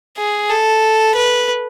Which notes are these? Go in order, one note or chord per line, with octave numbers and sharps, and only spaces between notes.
G#4
A4
B4